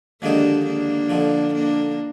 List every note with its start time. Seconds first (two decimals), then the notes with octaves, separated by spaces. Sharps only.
0.22 D#2 D3 F3 G#3 A#3 D4 D#4
0.66 A#3 D4
1.10 F2 D3 F3
1.54 A#3 D4